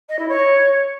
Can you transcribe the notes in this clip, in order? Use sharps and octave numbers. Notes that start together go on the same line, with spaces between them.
D#5
E4
C#5